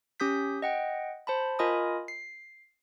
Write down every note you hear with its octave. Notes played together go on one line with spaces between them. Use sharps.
C#4 G4 D#6 G6 B6
D#5 F#5 G5
C5 A5 B5
F4 A#4 D#5 G#5 B5 D#6
C7